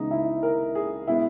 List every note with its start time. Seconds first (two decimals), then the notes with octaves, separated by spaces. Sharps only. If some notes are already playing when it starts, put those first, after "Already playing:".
Already playing: C#2 C#3 E3 G#3 B3 D#4
0.11 E4
0.43 A#4
0.75 G#4
1.08 B2 G#3 B3 E4